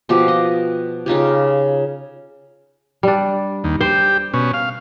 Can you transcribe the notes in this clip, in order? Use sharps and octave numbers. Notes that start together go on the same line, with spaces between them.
B2 F3 G4
D#5
C#3 D#4 F4 G4
G3 D4
D#2
G4 C5
B2 C#4
F5